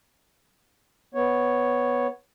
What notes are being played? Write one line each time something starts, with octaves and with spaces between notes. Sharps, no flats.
B3 C#5